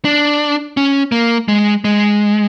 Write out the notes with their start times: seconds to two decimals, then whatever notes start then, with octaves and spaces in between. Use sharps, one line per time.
0.05 D4
0.77 C#4
1.12 A#3
1.48 G#3
1.84 G#3